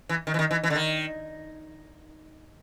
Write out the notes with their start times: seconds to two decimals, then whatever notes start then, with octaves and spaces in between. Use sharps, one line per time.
0.09 E3
0.27 D#3
0.34 E3
0.39 D#3
0.51 E3
0.63 E3
0.70 D3
0.75 D#3